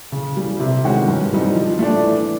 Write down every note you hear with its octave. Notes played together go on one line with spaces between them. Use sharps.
C#3
E3 G3
C3
D#3 G#3 C#4 F#4
G2
E3 G3 C4 D#4
F3
A3 D4
E3